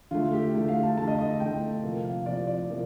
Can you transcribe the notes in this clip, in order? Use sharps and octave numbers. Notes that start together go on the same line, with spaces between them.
D3 A3 F4
G4
D3 A3 A4
F5
A5
D3 A3 A5
D#5
D#5
D3 A3 G5
C3 F3 A#3
F5
C3 F3 A#3 D5
D5
C3 F3 A#3